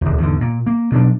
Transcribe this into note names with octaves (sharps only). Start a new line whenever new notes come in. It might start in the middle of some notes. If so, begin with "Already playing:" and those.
D1 G#1
E2 G#2 B2 D3
A#2
A#3
B2 F#3 D4